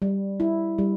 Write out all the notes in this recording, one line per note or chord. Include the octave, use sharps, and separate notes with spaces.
G3
E4
G3